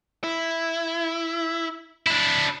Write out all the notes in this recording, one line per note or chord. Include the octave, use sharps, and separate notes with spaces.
E4
D4 E4